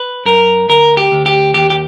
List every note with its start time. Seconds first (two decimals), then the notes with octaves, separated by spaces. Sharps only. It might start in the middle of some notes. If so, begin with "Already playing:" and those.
Already playing: B4
0.25 F#2 A#4
0.68 D2 A#4
0.97 G4
1.12 D2
1.26 G4
1.54 D#2 G4
1.70 G4